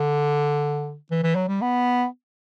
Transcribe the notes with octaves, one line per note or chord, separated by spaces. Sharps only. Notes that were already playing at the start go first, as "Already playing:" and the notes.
Already playing: D3
E3
E3
F#3
G3
B3